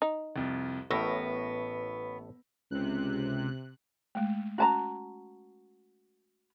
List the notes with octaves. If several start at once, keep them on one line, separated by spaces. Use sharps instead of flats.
D#4
C2 F2
A1 A2 B3 A#4 C#6 E6 A#6
C#2 C3 F#6
G#3 A3
C#4 F#4 A5 A#5